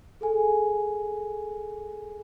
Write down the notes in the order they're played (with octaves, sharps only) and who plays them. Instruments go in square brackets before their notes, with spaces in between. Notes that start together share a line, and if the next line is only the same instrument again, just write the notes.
[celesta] G#4 A4 G#5